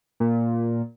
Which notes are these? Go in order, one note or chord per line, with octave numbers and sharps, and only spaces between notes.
A#2